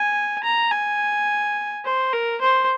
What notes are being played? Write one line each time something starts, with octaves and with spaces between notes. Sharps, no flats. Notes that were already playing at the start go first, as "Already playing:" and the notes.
Already playing: G#5
A#5
G#5
C5
A#4
C5